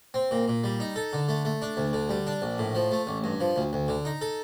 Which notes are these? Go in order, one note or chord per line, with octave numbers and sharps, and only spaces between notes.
C4
A#2
A#2
G3
D#4
A4
D3
A3
A3
D4
D2
D3
G3
D4
A#1
A2
F3
A3
A1
G2
F3
D2
D2
D3
D#4
A4